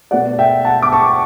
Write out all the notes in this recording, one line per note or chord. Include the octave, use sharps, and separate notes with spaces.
B2 A3 D5 F#5
E5 G5
F#5 A5
D6
A5 C#6